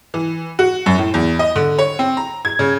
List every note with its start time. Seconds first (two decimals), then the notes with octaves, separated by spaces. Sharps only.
0.14 E3
0.59 F#4
0.86 F#2
0.98 A2
1.14 E2
1.39 D#5
1.56 D3
1.79 C#5
1.99 C4
2.17 A#5
2.45 G#6
2.59 C#3